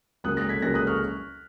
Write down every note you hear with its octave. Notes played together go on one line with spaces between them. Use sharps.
C#2 C#3 F#3 A#3 D#6 F#6
F#6 A#6
G#6 B6
C#2 C#3 F#3 A#3 F#6 A#6
D#6 F#6
C#6 F6